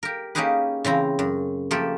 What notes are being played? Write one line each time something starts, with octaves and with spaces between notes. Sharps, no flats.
G4 A#4
A#3 C#4 D#4 G4 G#4 B4
C#3 E3 C4 A#5
F#2
F3 A3 A#3 G4 A4